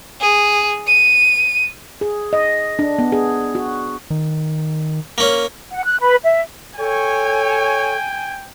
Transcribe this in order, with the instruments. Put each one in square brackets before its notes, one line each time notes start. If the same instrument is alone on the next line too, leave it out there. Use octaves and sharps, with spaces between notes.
[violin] G#4
D#7
[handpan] G#4
D#5
D4
B3
G#4
F#4
[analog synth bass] D#3
[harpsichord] A#3 C#4
[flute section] F#5
F#6
B4
E5
[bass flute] A4 [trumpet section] C#5 [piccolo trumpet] G5 [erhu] G#5